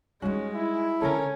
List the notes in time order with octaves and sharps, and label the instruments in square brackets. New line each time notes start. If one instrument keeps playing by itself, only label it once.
[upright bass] G3 D#4 [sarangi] G#3 [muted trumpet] C#4 [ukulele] F#4
[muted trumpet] E4
[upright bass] D3 C4 [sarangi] C#4 [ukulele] A4 A#4